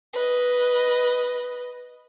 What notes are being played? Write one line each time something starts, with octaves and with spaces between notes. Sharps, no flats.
B4 D#5